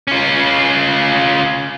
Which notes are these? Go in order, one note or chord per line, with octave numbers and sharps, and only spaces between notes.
C#4 F4